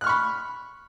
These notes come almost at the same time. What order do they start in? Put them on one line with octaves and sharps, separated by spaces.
F#6 F6 C#6 B5